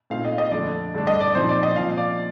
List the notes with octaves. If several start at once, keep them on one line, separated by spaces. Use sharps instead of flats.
A#2 A3 C4 D#4 F5
D#5
D#5
F2 D3 A3 D4 D5
G2 D3 A3 D4
D#5
D5
A#2 F3 C4 D#4 C5
D5
D#5
A#2 F3 C4 F5
D5